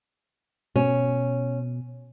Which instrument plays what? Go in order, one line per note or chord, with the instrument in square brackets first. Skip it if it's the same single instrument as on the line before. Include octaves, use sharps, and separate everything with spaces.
[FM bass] B2 [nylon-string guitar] C#4